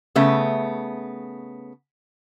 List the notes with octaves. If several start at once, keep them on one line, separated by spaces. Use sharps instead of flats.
C#3 A3 B3 E5